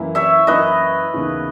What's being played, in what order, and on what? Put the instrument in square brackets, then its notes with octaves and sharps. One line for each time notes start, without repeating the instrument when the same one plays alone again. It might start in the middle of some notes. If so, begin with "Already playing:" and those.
Already playing: [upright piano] F#2 E3 A#3 E4
[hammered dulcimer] C#5 E5
[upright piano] F#2 E3 A#3 E4 [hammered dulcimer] B4 D#5
[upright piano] D#2 C#3 E3 B3